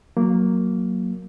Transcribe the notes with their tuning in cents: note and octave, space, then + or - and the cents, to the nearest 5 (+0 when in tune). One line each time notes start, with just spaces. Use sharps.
F#3 +0 A#3 +0